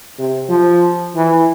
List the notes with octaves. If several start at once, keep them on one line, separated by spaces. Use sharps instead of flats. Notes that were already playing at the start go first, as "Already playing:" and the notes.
C3
F3
E3